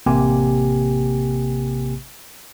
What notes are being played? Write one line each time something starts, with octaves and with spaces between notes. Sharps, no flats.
A1 C3 A#3 G4 G#5